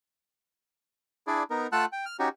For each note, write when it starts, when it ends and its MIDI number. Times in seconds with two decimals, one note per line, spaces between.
1.27 1.43 62
1.27 1.43 64
1.27 1.43 68
1.27 1.43 74
1.50 1.67 59
1.50 1.67 63
1.50 1.67 70
1.72 1.85 57
1.72 1.85 65
1.72 1.85 78
1.72 1.85 81
1.72 1.85 88
1.72 1.85 90
1.92 2.05 79
2.06 2.17 89
2.19 2.29 61
2.19 2.29 63
2.19 2.29 66
2.19 2.29 67